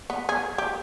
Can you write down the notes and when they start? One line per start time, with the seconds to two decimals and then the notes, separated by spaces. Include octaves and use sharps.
0.10 B3
0.29 G#4
0.58 G4